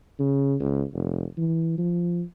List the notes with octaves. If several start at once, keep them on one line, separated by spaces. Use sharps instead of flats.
C#3
C#2
F1
E3
F3